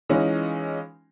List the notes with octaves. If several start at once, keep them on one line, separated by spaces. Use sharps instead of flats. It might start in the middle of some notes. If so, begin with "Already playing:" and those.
E3 G#3 C#4 D#4 F4